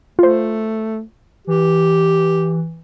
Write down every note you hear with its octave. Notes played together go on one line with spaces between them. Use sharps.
A3 F4 C5
E3 G4